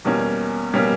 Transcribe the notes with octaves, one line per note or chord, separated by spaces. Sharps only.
E2 B2 G3 A#3 C#4
B2 G3 A#3 C#4